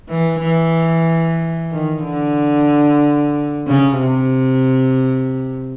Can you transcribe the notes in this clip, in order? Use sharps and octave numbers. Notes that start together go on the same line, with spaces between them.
E3
E3
D#3
D3
C#3
C3